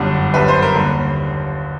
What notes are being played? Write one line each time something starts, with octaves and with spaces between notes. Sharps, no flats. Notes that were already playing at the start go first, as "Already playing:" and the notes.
Already playing: G1 F#2 D3 G3
G1 F#2 D3 G3 B4
C5
A#4
D#2 D3 G3